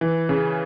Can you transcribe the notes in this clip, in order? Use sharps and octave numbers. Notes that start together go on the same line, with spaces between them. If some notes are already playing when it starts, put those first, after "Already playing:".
E3
C#3